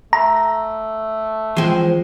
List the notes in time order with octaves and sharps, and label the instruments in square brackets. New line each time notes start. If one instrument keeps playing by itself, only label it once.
[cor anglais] A3 [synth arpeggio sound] A#5
[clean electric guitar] E3 F3 [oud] G#3 C4